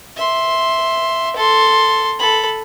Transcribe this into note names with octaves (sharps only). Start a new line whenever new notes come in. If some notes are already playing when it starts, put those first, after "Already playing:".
E5 C6
A4 C6
A4 B5